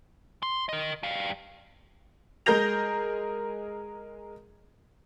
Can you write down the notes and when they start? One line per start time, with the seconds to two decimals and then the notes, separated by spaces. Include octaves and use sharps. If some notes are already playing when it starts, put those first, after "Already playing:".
0.43 C6
0.69 A#4 D#5
1.03 G3 F5
2.46 G#3 G#4 A#4 G6 A#6 F7